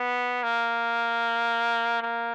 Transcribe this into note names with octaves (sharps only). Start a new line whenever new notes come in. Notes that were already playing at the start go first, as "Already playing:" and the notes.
Already playing: B3
A#3
A#3